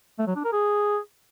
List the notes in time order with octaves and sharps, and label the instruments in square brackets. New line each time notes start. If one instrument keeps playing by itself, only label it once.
[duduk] A3
F#3
D4
A#4
G#4